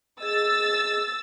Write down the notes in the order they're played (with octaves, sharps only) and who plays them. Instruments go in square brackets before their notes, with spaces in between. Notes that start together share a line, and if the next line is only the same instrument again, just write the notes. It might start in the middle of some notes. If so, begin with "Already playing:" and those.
[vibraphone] G#4 D#5 [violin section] E6 A6